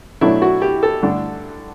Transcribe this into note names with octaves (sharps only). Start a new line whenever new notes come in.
B2 F#3 A3 D4 E4
F#4
G4
A4
G2 D3 A3 D4